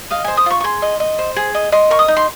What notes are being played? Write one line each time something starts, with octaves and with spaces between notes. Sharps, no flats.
D#5 F5
C5 G#5
D#6
F4 C#6
C#6
G#4 C6
D#5
D#5
C5
G#4
D#5
D#5 C6
A#4 C#6
D#6
D#4
C6